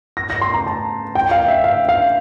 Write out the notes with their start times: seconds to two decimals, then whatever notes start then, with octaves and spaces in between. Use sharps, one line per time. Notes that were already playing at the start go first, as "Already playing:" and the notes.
0.17 A#6
0.30 A#6
0.41 C6
0.54 A#5
0.67 A5
1.15 G5
1.31 F5
1.48 E5
1.64 F5
1.89 F5